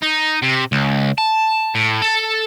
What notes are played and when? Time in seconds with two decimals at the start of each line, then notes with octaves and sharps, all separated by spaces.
0.02 D#4
0.42 C3
0.72 C#2
1.18 A5
1.75 A2
2.02 A4